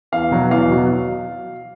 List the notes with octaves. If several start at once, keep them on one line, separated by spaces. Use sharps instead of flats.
E2 F5
B2 F#3
E2 F5
B2 F#3